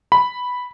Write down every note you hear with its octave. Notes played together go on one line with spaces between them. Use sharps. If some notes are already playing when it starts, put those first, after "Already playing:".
B5